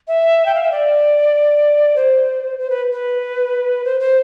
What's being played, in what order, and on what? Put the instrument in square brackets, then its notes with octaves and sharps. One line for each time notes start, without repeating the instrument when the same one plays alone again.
[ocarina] E5
G5
F5
E5
D5
C5
C5
B4
B4
C5
C5